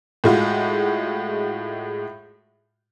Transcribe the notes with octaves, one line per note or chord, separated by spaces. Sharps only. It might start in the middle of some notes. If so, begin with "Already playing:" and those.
A2 G#3 F4 F#4